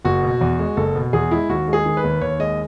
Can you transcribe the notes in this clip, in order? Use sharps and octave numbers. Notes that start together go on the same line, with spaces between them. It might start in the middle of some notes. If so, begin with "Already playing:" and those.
F#1 F#4
B2
E2
G#3
F#1 A4
B2
E2 G#4
G#3 E4
D#2 F#4
G#3
G#4
D#3
B4
D#2
D#2 C#5
G#3 D#5